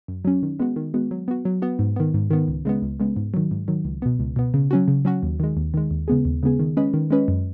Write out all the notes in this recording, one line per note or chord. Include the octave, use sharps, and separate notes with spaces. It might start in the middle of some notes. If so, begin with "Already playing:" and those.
F#2
F#3 C#4
D#3
G#3 B3 F#4
D#3
G#3 B3 F#4
F#3
B3 F#4
F#3
B3 F#4
G#2
D#3 B3
G#2
D#3 B3
C#2
C#3 G#3 B3
C#2
C#3 G#3 B3
G#2
D#3 F#3
G#2
D#3 F#3
C#2
B2 B3
C#2
B2 B3
C#3
F#3 C#4 F#4
C#3
F#3 C#4 F#4
D#2
D#3 G#3
D#2
D#3 G#3
D#2
C#3 G#3 B3 G#4
D#2
C#3 G#3 B3 G#4
D#3
G#3 C#4 B4 D#5
D#3
G#3 C#4 B4 D#5
F#2